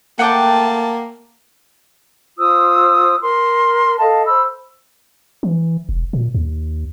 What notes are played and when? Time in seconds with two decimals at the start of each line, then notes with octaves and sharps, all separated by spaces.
0.19 A3 A#3 F#5 G5 A5 D6
2.38 F4 C5 D#6 E6
3.21 A#4 C6
4.00 A4 D#5 F5 A5
4.26 C5 B5 E6
5.43 E3
5.89 E1
6.13 A#2
6.34 D#2